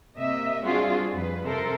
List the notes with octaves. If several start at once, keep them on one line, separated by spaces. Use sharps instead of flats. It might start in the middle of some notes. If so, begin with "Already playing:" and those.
C3 A#3 D#5 E5
G3 C4 D4 F4 F#4 G#4
F2 B4
C3 A4 A#4 C5